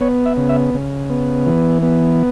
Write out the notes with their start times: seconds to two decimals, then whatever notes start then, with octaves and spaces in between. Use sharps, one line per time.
0.01 B3 C#5
0.26 E5
0.37 C#3
0.49 E5
0.74 C#3
1.10 B3
1.46 E3
1.82 B3